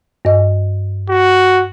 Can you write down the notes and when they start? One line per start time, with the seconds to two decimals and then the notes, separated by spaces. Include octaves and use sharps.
0.25 G2 D#5
1.09 F#4